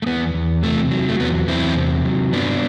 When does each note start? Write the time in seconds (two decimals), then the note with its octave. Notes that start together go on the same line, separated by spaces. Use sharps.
0.02 A3
0.06 E2 B3
0.34 E2
0.63 C3 A3
0.91 F#3
1.09 A3
1.20 E2 B3
1.48 E2 C4 E4
1.76 C3
2.05 F#3
2.32 G2 B3 D4